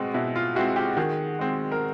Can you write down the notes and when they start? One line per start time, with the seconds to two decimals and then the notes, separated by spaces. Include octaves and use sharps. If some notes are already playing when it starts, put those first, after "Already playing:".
Already playing: B2 G#3 C4 F#4
0.14 B2 E4
0.36 F4
0.55 G#3 C4 E4 F#4
0.76 F4 G4
0.97 D#3 F#4 G#4
1.39 G#3 C4
1.72 A#4